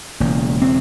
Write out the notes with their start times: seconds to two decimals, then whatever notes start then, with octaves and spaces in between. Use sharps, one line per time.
0.20 E1 E2 C#3 A#3
0.61 C4